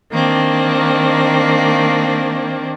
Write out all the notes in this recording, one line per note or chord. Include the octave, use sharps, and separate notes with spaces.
D#3 A#3 C4 D4